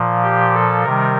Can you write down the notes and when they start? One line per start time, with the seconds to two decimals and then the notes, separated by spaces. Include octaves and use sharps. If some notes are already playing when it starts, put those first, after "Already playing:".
Already playing: A#2 F3
0.23 G4
0.53 A4
0.83 C3 D#3 G3 A#4